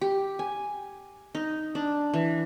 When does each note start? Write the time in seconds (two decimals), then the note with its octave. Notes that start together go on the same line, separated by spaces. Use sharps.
0.01 G4
0.39 G#5
1.35 D#4
1.75 D4
2.14 E3